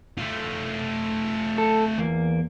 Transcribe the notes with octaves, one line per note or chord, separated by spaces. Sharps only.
A3 F4
A4
E2 A#3